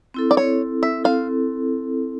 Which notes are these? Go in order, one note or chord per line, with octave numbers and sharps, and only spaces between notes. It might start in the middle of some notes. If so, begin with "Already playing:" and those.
C4 E4 A4
D5
C#5
E5
C4 E4 A4 F5